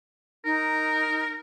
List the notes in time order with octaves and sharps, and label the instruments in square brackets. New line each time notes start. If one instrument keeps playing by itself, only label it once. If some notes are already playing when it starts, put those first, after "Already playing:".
[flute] D#4 [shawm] A#4